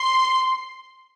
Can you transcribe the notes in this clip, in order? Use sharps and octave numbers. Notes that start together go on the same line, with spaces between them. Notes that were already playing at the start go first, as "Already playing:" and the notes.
Already playing: C6